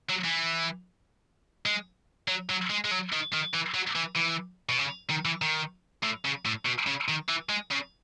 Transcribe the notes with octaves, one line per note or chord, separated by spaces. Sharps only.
F#3
E3
G#3
F#3
F#3
G#3
G#3
F#3
D#3
D#3
E3
F#3
E3
E3
B2
C#3
D#3
E3
D#3
A2
C#3
A2
B2
C#3
D#3
E3
G#3
C#3